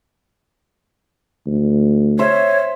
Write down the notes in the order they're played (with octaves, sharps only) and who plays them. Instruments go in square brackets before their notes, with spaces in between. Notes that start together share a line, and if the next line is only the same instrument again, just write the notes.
[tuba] D2
[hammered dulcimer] C5 E5 [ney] C#5